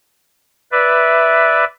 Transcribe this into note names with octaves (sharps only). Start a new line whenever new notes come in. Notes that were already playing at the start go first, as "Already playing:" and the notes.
B4 D5 E5